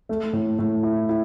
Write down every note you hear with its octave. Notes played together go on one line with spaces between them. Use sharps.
A3
A2
A2
E4
E4